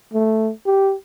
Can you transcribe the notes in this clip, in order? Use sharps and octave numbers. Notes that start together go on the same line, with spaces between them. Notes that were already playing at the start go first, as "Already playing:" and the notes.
A3
G4